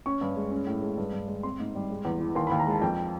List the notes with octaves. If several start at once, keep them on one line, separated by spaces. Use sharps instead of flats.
C#4 C#6
G2
G#3
C#4
A2
G#3
G2
G2
G#3
C4 C6
G#2
G3
G#3
E2
E3
D#2 C6
D#2 B5
A#5
G#3 A5
F2 G5